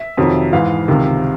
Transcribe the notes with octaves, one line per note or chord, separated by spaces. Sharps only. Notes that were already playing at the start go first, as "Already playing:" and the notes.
Already playing: E5
F2 C3 D#3 F#3
G#2 E3 F5
C#2 C3 D#3